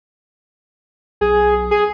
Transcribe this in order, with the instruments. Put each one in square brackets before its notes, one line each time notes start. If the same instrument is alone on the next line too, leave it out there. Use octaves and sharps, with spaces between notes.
[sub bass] B1 [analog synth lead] G#4
[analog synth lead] G#4